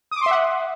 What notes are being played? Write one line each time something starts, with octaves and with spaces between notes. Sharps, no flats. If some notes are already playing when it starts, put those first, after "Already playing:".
E5 F#5 C6 D6 D#6